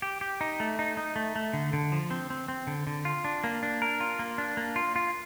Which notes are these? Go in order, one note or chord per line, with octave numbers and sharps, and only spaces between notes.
G4
G4
D#4
A3
D#4
D#4
A3
A3
D3
D3
F3
C4
C4
C4
D3
D3
F4
D4
A#3
D4
A#4
F4
A#3
D4
A#3
F4
F4